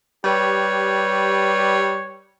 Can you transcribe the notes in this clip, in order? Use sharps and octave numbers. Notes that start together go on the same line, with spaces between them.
G3 G4 B4 C#5